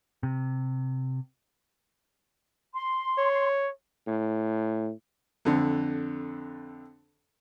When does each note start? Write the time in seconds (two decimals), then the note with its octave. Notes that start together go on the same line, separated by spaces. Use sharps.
0.23 C3
2.74 C6
3.18 C#5
4.07 A2
5.45 F2 D3